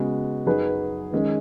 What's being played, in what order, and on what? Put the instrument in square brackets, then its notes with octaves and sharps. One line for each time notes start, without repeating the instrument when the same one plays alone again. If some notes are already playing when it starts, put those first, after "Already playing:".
Already playing: [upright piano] C#3 G#3 B3 F#4
F#2 F#3 D#4 G#4 B4
D#3 G#3 C#4 G#4